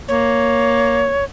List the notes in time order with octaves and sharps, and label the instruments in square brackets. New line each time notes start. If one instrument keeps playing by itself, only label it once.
[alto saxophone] A#3 [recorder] C#5